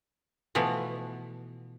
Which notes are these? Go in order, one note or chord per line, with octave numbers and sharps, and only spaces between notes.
B2 E3 F3 A3 B3